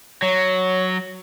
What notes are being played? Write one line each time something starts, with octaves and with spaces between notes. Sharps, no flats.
F#3 C#5